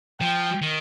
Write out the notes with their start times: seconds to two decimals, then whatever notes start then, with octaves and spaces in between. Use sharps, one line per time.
0.21 F3 G5
0.62 D#3